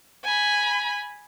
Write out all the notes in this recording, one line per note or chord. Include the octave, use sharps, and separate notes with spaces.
G#5 B5